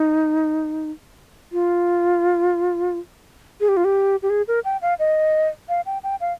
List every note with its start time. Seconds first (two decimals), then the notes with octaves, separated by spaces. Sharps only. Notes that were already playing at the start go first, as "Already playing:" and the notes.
Already playing: D#4
1.52 F4
3.61 G#4
3.69 G4
3.77 F4
3.85 G4
4.22 G4
4.30 G#4
4.48 A#4
4.65 G5
4.82 F5
4.99 D#5
5.69 F5
5.86 G5
6.04 G5
6.21 F5